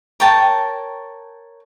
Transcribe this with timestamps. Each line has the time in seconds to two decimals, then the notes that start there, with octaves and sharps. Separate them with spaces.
0.20 A#4 C#5 G5 A5